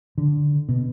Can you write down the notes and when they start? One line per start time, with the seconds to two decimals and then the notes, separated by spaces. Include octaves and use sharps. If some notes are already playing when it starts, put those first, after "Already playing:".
0.18 D3
0.69 B2